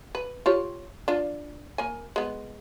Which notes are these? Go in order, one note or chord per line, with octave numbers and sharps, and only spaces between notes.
B4
F4 G4 C#5
D4 F4
A#3 G#5
G#3 B3